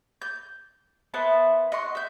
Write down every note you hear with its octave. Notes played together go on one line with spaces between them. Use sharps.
G6
B3 E4 C5 A5
D#5 F#5 C6 C#6
E5 G6